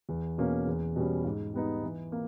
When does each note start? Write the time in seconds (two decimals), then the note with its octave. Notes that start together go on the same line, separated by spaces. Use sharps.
0.09 E2
0.38 B2 A#3 C#4
0.67 E2
0.96 B2 G3 C#4
1.25 G#2
1.54 G3 B3 D#4
1.83 E3
2.12 A#3